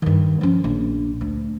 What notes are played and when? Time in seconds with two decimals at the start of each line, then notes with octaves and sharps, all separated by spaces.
0.02 G2 D#3
0.41 F3 C#4
0.64 A#1
1.21 D2